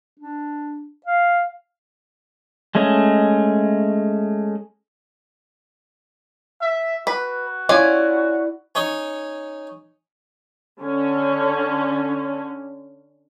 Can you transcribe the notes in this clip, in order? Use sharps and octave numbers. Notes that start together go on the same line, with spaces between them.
D4
F5
G#3 A3 C#4 D#5
E5
F#4 B4
C#4 E4 F4 D5 G#5
C#4 D#4 C#5
D3 C#4